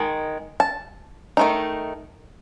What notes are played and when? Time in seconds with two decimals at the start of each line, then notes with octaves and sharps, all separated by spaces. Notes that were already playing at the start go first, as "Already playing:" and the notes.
Already playing: D#3 G#3
0.60 A5
1.37 D#3 A3 D#4